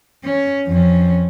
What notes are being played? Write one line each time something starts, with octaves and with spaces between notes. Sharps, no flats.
C#4
F2 C#4